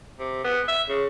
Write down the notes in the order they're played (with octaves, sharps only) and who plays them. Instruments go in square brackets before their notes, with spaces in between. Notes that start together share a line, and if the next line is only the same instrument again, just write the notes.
[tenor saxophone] C3
B3
E5
C#3